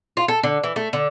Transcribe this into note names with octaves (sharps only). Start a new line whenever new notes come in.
F4
A4
D3
E3
A3
D3